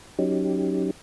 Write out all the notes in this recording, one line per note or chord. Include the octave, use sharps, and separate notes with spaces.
F#3 C#4 D#4 G4